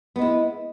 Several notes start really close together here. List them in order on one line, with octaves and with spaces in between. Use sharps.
B3 G#3 E4